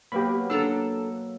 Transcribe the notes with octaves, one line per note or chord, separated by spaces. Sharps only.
B2 F#3 A#3 G4 B4 B5
D4 A4 A#5 E6